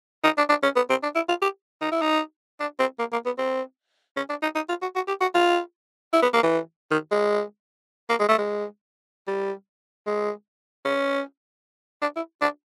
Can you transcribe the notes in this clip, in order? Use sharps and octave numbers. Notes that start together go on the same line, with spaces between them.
D#4
D4
D4
C#4
B3
C4
D4
E4
F4
G4
D#4
E4
D#4
D4
C4
A#3
A#3
B3
C4
C#4
D4
D#4
D#4
F4
F#4
F#4
G4
F#4
F4
E4
B3
A#3
E3
D#3
G#3
A#3
G#3
A3
G#3
G3
G#3
C#4
D4
E4
D4